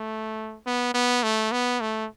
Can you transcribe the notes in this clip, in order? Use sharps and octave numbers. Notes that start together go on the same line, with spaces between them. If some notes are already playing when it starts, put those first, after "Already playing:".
Already playing: A3
B3
B3
A3
B3
A3